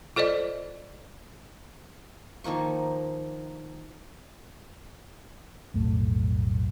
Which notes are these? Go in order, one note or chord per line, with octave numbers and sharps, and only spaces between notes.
F4 A4 C5 D5 D#5
D#3 F3 A#3 C#6
B1 F2 A2 A3